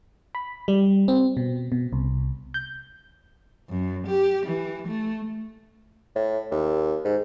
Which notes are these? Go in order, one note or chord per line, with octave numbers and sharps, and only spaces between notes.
B5
G3
C4
B2
B2
C2
G6
F#2
G4
E3
A3
A2
D#2
G#2